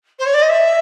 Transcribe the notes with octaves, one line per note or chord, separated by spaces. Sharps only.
C5
C#5
D5
D#5
E5